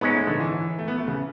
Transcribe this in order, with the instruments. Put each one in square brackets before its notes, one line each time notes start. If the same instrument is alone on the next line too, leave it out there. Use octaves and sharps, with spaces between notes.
[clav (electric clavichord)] G#2 G#3 C#4 [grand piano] B3
[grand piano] A3
D3
E3
A3
B3
A3
C#3